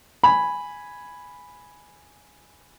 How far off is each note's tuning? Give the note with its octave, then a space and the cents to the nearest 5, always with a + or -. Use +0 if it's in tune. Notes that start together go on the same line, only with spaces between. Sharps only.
G#5 +0 B5 +0